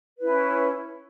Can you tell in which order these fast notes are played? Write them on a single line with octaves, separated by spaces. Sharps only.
B4 E4 C#4